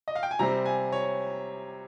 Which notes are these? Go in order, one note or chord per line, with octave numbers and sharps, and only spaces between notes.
D#5
F5
G5
G#5
C3 G3 C4 A#5
G#5
C#5